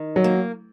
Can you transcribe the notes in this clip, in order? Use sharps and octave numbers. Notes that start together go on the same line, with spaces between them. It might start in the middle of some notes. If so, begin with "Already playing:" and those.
Already playing: D#3
F#3
A#3